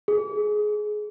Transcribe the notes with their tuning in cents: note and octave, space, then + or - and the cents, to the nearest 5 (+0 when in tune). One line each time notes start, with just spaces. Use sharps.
G#4 +20